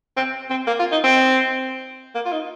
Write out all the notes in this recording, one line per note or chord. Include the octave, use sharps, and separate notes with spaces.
C4
C4
A#3
F4
D#4
C4
A#3
F4
D#4